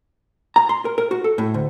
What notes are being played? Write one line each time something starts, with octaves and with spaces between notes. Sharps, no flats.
A#5
C6
A#4
A#4
F#4
A4
A2
D2